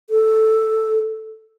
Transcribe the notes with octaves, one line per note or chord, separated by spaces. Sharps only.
A4